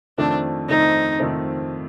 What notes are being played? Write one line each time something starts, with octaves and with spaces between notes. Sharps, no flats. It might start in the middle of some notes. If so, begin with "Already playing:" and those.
F2 D#3 A3 C4 D4
F2 D#3 A3 C4 D#4
F2 D#3 A3 C4